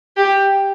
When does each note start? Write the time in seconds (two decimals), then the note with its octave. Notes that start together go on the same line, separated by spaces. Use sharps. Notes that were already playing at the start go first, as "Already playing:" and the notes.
0.17 G4